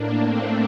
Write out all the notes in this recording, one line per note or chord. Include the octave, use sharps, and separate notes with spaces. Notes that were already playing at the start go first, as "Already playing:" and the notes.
Already playing: A2 A#3 D4
A3 C4